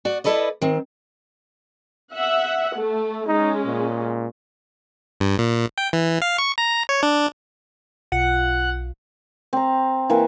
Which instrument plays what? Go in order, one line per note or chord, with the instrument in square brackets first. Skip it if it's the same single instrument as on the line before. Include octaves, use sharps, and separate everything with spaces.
[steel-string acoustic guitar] F#4 D5
E4 A4 B4 D5 D#5
D#3 C4
[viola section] E5 F#5
A3
[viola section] G#3 C#4 [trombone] D#4
[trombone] A#2
[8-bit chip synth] G2
A#2
G5
E3
F5
C#6
A#5
C#5
D4
[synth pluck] B1 F4 [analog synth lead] F#5
[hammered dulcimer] C4 A#5
E3 A#3 E4 B4